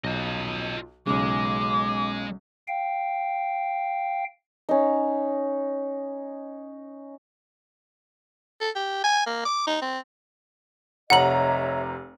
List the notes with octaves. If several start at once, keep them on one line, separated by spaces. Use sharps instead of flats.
B1 F4 D#5
B1 C#3 G#3 D6
F5 G5
C#4 D#4
A4
G4
G#5
A#3
D6
D#4
C4
F1 C3 C#5 D#5 E5 F#5 A#5 F#7